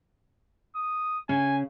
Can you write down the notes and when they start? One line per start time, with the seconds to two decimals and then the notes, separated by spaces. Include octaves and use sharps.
0.76 D#6
1.29 C#3 C#4 G#5